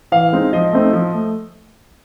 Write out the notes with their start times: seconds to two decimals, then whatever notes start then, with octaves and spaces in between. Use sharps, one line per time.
0.12 E3 F5
0.32 G#3 C4 D#4
0.53 F3 D#5
0.73 A3 C4 D#4
0.93 F3
1.14 A3